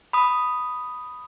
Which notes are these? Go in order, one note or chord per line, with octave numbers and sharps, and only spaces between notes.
B5 D#6